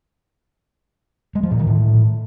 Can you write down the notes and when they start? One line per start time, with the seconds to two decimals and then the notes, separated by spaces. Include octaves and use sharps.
1.35 G#3
1.43 F3
1.51 A#2
1.59 D#3
1.67 A2